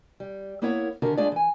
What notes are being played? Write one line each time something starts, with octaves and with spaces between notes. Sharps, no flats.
G3
A#3 B3 E4 A#4 C#5 F#5
D3 D#3 C#4 F#4 G4 A#4
G#3 A3 D4 F4 G#4 D5
E3 G#5